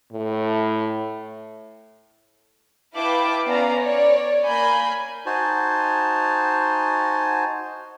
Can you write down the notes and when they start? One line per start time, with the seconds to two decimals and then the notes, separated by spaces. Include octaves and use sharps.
0.13 A2
2.95 E4 B4 F5 G5 A5 D6
3.46 B3 C#4 D5 F5 A#5
3.80 C#5 D5
4.47 A#3 G#5 B5 G6
5.26 D#4 F#4 C5 G#5 A5